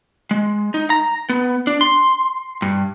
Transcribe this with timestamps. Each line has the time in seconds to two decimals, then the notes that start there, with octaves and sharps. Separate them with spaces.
0.31 G#3
0.74 D#4
0.90 A#5
1.29 B3
1.67 D4
1.81 C6
2.62 G2